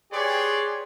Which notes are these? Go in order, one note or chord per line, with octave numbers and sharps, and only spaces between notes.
G4 G#4 B4 C#5 D5 C6